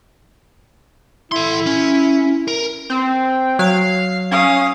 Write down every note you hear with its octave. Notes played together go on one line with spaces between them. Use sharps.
E4 A4 C6
C#4
A#4
C4
F#3 F5
C#4 F5 D#6